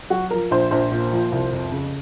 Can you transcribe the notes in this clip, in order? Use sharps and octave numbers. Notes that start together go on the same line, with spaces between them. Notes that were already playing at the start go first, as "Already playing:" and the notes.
F#3 F#4
F3 A#4
A#1 C5
A#1 C5
A#2
F3
C2
F2
C#3